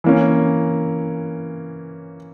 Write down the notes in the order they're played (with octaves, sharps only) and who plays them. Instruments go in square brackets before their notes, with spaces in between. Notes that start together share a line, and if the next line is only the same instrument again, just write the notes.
[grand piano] E3 A#3 C#4